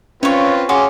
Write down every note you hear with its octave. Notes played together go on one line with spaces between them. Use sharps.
C4 C#4 F4 B4 C#5 C#6
C#4 F#4 G#4 C6 D6